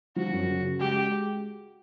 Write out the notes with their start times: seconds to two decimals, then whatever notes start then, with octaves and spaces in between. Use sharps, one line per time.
0.16 F3 F#4
0.33 F#2
0.48 C#3
0.64 C#3
0.80 G#3 G4
0.96 G#3